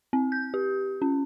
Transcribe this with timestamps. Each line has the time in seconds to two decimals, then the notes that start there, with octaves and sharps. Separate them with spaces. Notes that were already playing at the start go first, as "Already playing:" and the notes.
0.13 C4
0.32 G6
0.54 G4
1.02 C#4